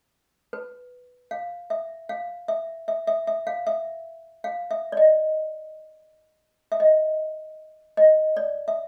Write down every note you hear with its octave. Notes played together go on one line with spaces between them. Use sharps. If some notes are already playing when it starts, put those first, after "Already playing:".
B4
F5
E5
F5
E5
E5
E5
E5
F5
E5
F5
E5
D5
D#5
E5
D#5
D#5
D5
E5